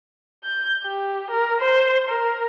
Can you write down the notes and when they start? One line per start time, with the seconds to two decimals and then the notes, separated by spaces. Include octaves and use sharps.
0.44 G6
0.84 G4
1.30 A#4
1.60 C5
2.09 A#4